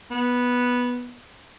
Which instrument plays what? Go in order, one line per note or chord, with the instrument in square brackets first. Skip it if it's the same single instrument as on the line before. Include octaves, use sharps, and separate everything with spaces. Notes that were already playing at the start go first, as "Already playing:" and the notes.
[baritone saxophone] B3